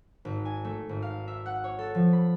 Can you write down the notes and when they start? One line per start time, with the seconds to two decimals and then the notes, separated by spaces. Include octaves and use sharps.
0.25 G#1
0.45 G#5
0.65 A3
0.89 G#1
1.02 F5
1.28 E5
1.46 F#5
1.64 C#5
1.79 A4
1.95 F3
2.13 B5